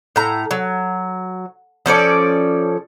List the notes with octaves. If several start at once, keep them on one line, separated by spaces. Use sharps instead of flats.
A2 A#5
F#3
F3 C#4 A4 D5